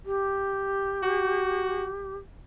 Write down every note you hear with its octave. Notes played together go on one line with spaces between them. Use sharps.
G4
F#4